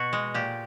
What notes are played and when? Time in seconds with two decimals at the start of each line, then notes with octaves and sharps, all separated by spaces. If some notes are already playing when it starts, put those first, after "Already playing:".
Already playing: B2 F#4
0.13 G#3
0.34 A#2 G4